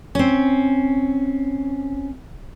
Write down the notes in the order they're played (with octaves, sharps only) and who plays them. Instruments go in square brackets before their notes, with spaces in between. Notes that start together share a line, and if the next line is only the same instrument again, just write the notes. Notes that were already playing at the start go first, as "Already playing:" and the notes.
[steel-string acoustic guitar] C4 C#4